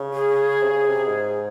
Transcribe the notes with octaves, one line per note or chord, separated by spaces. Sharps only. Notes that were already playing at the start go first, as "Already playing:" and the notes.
Already playing: C#3
G#4
C3
C#3
C3
G#2